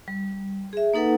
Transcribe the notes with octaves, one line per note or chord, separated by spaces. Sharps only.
G3
G#4 E5
A#3 D#4 A4 B4 F#5